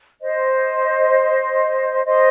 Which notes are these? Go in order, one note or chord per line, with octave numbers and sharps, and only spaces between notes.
C5 D#5
C5 D#5